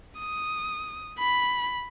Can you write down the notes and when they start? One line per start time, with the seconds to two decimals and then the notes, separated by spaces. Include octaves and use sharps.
0.20 D#6
1.19 B5